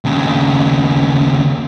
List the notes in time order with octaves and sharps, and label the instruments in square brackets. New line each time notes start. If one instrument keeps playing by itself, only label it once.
[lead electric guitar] D#2 C#3